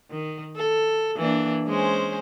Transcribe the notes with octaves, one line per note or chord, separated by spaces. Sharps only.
D#3
A4
E3 A#3 D4
G#3 C#4 C5